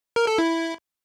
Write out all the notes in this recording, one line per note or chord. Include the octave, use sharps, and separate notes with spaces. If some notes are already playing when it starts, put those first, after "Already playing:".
A#4
A4
E4